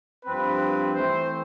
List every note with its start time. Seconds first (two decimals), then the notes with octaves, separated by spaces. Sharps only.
0.24 G2 F3 C4 B4
0.59 B4
0.94 E3 A3 C4 C5